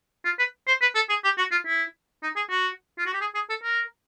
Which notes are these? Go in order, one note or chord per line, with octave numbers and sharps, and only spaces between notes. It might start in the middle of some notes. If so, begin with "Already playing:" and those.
F4
B4
C5
B4
A4
G#4
G4
F#4
F4
E4
D#4
G#4
F#4
F4
F#4
G4
G#4
G#4
A4
A#4